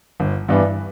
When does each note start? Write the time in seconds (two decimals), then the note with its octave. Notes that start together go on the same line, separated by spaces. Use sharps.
0.20 G1
0.49 G2 E3 B3 D4